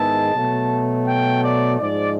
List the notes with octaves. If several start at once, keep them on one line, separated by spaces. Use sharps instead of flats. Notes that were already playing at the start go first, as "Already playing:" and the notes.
Already playing: G#2 D#3 G#3 B3 E4 A5
B2 F#3 A3
G5
D5
G#2 F3 G#3 D5